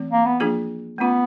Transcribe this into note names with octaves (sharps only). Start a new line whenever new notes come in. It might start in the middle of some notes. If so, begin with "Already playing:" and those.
Already playing: E3 A3 C4
A#3
B3
F3 A#3 D4 F4 G#4
A3 B3 C#4 F4